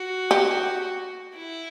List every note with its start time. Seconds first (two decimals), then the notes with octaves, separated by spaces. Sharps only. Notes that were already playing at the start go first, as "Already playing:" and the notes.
Already playing: F#4
0.31 G4
1.36 E4